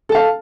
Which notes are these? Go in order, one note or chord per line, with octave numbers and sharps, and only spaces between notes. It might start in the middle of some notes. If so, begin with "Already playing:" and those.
A4 F5 A5